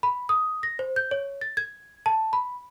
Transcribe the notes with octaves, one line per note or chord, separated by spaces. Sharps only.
B5
D#6
A#6
C5
G6
C#5
A6
G#6
A5
B5